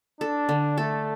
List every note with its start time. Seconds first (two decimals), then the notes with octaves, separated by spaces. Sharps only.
0.21 D4 A4
0.49 D3
0.78 A3 A4